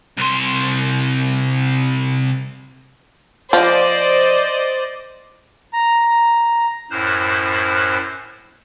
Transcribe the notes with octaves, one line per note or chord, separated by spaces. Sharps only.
C2 C6
F3 C5 D5 D#5
A#5
F#2 A2 C5 F6 F#6